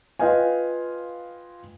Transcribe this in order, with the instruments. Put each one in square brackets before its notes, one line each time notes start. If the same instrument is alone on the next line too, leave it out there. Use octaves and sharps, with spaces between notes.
[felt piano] F4 B4 D#5 F5 G5 G#5